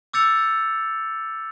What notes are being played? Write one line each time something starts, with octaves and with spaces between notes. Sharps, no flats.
D6 E6 G6 A6 C#7 F7